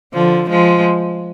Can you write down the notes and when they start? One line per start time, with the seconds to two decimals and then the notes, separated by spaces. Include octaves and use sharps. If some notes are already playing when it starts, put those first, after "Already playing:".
0.13 D3 F3
0.49 F3 G#3